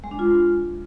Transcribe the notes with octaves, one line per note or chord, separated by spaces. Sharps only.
G#3
D4
F4